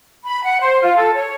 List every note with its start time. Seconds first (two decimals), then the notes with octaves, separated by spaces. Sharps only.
0.25 B5
0.44 F#5
0.60 C5
0.82 F4
0.96 A4
1.14 C#5